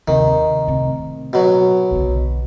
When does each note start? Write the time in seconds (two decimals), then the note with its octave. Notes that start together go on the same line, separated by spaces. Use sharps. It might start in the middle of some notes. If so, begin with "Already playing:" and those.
0.08 D#2 C3 D#3
0.67 A2 C3
1.33 B2 F#3
1.91 B1 D3